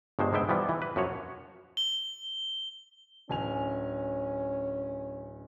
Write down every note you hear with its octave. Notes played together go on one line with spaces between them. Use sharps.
G1 G2 G#3 C5
G#2 G#3 B3 E5 G5
E3 F3 G3 B3
E3
B4
F#2 F3 F#4 C#5
G7
D1 C#4 G#5 F7